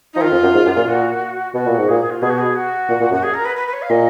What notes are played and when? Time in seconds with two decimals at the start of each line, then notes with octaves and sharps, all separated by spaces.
0.14 D#4
0.16 F3
0.21 D#3 F4
0.32 F2
0.43 F#2
0.54 G#2
0.66 F#2
0.76 A#2
0.88 A#2 F#4
1.54 B2 F#4
1.66 A#2
1.78 G#2
1.88 A#2 G#4
2.00 G#4
2.10 F4
2.22 B2 G#4
2.30 F#4
2.38 G#4
2.55 F#4
2.89 A#2
3.01 A#2
3.11 F#2
3.14 F#4
3.23 G#4
3.34 A#4
3.45 B4
3.56 B4
3.68 B4
3.73 C#5
3.82 F5
3.90 A#2 D#5